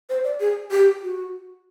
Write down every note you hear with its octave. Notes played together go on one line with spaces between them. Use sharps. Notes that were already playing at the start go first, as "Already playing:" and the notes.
C5
D5
G#4
G4
F#4